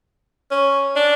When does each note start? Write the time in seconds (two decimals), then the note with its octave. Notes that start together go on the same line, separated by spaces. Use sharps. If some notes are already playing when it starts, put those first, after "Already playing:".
0.51 C#4
0.96 D4